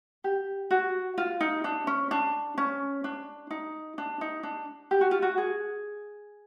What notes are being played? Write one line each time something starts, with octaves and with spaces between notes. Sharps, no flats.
G4
F#4
F4
D#4
D4
C#4
D4
C#4
D4
D#4
D4
D#4
D4
G4
F#4
F4
F#4
G#4